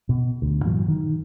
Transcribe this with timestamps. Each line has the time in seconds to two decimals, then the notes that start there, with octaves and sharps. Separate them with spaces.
0.09 B2
0.42 D2
0.64 G2 A#2 E3 F#3
0.88 D#3